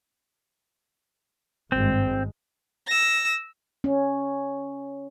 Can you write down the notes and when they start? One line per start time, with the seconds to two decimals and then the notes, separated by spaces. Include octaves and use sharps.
1.72 G#1 G2 G#3 C4
2.87 E6 A#6
3.84 C#4